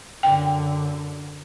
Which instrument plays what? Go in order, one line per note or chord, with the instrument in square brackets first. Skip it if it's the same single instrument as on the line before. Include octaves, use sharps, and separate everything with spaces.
[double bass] F#2 D3 [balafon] G5